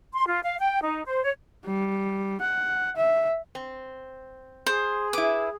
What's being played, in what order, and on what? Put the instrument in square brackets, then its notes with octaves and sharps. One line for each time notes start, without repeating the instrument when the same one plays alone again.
[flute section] C6
F4
F5
G5
D#4
C5
C#5
[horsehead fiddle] G3
F#5
E5
[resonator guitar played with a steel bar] C4
[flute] G#4 [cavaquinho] C5
[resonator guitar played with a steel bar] E4 B4 [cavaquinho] D6